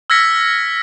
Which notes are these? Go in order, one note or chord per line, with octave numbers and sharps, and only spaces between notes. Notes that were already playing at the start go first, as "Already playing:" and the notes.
E6 F6 G#6 A#6 B6 C#7